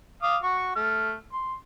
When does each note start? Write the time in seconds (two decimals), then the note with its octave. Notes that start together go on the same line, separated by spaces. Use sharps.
0.22 F5 D6 D#6
0.43 F#4 C#6
0.76 A3 F6
1.33 C6